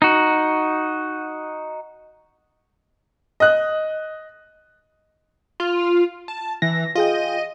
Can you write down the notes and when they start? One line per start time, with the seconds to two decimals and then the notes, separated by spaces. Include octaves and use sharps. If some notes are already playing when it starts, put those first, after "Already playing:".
0.02 D#4 F#4
3.40 D#5 F#6
5.60 F4
6.28 A5
6.62 E3 A#6
6.95 F4 G#4 D#5 G5